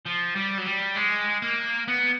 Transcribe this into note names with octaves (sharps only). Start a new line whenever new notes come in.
F3
G3
F#3
G3
G#3
A#3
B3